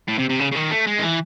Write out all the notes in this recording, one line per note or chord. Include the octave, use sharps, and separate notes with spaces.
A2
C3
C3
C#3
C#3
D#3
A3
G#3
D#3
E3